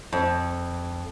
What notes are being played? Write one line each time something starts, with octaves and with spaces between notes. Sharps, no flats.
F2